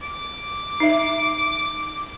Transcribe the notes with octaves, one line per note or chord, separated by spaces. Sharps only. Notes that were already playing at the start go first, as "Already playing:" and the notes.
D6
D#4 E5